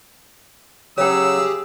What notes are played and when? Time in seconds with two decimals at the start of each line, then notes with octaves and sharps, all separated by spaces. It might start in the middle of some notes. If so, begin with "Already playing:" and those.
0.98 C#3 F#3 G4 G#4 C#5 G5 E6